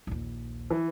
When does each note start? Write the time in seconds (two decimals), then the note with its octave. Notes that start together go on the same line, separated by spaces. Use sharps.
0.07 A#1 D#2
0.71 E3